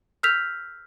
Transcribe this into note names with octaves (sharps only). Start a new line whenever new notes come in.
E6 F6 G6 B6 F7